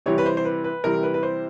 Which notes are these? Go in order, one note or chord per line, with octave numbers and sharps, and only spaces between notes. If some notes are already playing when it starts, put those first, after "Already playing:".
C3 E3 G3 C#5
B4
C5
C5
B4
B4
C3 E3 G3 A#4
B4
B4
C5